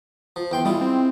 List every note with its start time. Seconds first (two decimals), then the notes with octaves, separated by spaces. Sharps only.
0.36 F3
0.52 E2 G5 C6
0.65 G3 G#3 E4 F4
0.81 C4